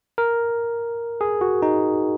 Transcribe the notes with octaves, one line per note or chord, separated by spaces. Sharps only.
A#4
G#4
F#4
D#4